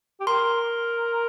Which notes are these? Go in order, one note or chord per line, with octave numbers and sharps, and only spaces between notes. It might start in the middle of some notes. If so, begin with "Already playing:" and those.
G4
A#4 C6